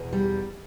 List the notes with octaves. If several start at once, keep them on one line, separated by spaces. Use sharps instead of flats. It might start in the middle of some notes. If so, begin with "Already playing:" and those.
Already playing: E2 B2
G3